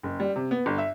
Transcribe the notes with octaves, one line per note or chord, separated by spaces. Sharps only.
F#1
G3
C3
B3
G1
E5